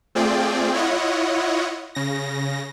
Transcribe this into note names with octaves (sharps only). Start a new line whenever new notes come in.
A3 C4 F4 G#4 D5 G5
E4 F4 C#5 D#5 F#5
C#3 A#6